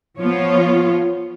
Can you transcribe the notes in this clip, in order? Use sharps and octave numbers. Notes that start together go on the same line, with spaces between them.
F3 B3 F4 C#5